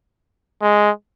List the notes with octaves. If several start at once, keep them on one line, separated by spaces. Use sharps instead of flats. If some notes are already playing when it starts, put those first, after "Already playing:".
G#3